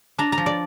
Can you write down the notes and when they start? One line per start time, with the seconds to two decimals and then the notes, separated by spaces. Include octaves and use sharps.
0.18 D4 A#5
0.32 A#5
0.38 F3
0.46 D5